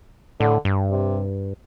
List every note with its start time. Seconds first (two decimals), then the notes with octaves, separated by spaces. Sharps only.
0.40 A2 D3
0.65 G2
0.91 C3